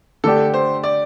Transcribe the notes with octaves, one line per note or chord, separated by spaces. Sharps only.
D3 A3 D4 G4 A4
C5
D5